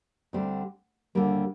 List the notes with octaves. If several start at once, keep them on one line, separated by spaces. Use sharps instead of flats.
D2 D3 G3 C4
D#2 D3 G3 A#3